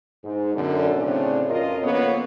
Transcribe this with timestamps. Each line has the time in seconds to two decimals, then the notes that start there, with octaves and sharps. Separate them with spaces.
0.24 G#2
0.55 F#2 B2 D3
0.95 A2 C#3 C4 D4
1.49 F2 B2 C#4 F4 A#4 D#5
1.83 C#3 F3 A#3 B3 A4 C#5